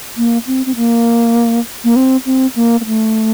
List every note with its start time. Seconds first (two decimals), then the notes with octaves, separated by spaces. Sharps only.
0.17 A#3
0.47 C4
0.66 C4
0.76 A#3
1.84 A#3
1.96 C4
2.26 C4
2.56 A#3
2.81 A#3
2.85 A3